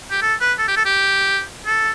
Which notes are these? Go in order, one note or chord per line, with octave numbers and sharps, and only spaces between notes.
G4
A4
B4
A4
G4
A4
G4
A4